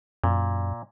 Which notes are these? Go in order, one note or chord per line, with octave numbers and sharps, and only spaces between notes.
F#2 A#2